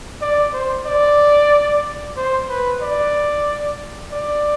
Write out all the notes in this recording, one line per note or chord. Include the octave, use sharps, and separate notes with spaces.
D5
C5
D5
C5
B4
D5
D5